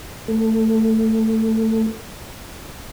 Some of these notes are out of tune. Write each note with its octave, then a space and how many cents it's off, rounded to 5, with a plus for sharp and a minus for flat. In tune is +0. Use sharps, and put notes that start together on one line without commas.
A3 +15